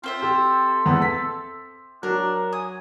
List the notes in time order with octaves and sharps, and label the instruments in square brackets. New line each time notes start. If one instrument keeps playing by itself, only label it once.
[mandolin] C4 C5 E5 [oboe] F4
[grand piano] G4 [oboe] A4
[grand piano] E2 B3
B6
[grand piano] F#3 [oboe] D4 [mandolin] A#4
[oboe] G#5 [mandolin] D#6